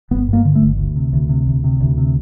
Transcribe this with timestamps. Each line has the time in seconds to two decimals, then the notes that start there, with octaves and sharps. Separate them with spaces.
0.11 G1 B3
0.28 G2 A#3
0.45 D3
0.55 A3
0.61 G1
0.78 D2
0.96 C3
1.13 D2
1.29 C3
1.46 D2
1.64 C3
1.80 D2
1.98 C3